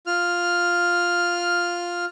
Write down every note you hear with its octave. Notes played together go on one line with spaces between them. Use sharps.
F4 F6